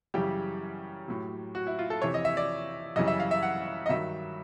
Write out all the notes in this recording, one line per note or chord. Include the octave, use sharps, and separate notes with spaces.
F#2 C#3 E3 G3 G4
A2 F#3
F#4
E4
F4
A4
F2 C3 E3 C#5
D#5
E5
D5
F#2 C#3 E3 G3 D#5
E5
F5
E5
F#5
D#5
G2 D#3 F#3 E5